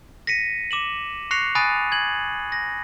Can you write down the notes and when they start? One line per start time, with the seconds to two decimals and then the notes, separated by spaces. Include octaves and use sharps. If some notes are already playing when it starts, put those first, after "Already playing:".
0.27 A#6 B6 C#7 D#7
0.71 D6 E7 F#7
1.31 C#6 F#6 A#6 C7 C#7 F7
1.55 G#5 B5 D#6 F#6 A6 D#7
1.92 G#6 F#7
2.52 A#6